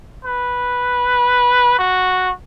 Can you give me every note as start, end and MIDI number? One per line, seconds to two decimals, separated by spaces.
0.25 1.75 71
1.79 2.31 66